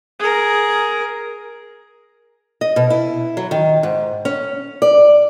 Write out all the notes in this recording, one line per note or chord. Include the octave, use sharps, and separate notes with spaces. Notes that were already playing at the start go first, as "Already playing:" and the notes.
G#4 A#4
D#5
B2
E4
F#3
D#3
G#2
C#4
D5